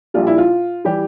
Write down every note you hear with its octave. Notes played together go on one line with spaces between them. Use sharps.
A#1 A#2 G3 F4
E4
F4
E3 G3 G4